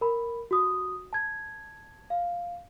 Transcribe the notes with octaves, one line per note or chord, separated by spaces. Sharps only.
A#4 B5
F#4 D#6
A5 G#6
F5